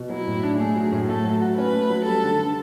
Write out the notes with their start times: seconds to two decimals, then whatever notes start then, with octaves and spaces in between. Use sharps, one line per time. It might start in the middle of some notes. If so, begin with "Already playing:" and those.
Already playing: B2
0.09 F#3 E4
0.27 A2
0.43 D4
0.59 A3 G#4
0.76 F#3
0.92 A2
1.08 A3 A4
1.24 F#3
1.41 F#4
1.58 C#4 B4
1.74 A3
1.90 F#3
2.07 G3 A4
2.24 D3
2.39 D3